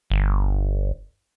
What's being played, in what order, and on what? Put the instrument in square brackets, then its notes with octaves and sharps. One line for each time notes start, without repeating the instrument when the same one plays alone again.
[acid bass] G1